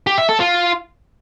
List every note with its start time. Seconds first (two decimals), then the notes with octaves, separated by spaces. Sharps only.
0.07 G4
0.18 E5
0.29 A4
0.40 F4